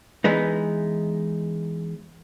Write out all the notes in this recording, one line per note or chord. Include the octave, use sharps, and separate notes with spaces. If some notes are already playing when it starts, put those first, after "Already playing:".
E3 G#3 B3 D#4